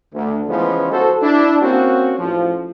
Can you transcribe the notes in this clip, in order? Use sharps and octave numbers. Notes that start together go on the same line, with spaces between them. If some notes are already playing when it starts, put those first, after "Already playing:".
D2
C#3 E3 F3 G#3 B3 C#4
F#4 A4 C5
D4 E4
A#3 C4 C#4 F#4
A1 F3